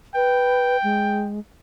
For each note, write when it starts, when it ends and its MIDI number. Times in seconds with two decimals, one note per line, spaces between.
0.15 0.77 71
0.15 1.28 79
0.84 1.40 56